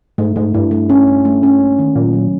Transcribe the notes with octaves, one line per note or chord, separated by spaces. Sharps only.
G#2 A3
G#2 A3
G2 E4
A3
C#4
A3
A3
C#4
A#3
D#3
A#2 F#3
F#3